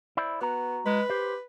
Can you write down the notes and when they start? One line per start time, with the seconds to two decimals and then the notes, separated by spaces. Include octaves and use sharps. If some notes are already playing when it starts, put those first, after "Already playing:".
0.17 E4 C5 D5
0.41 B3 F#4 A#5
0.86 G#3 B4
1.10 G4 C5